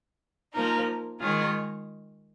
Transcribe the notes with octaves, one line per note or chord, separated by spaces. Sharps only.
F3 A#3 D#4 A#4
D#3 G#3 F4 G#4 C#5